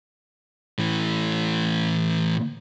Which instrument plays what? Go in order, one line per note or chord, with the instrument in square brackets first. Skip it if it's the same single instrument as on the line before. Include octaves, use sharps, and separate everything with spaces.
[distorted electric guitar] A2 E3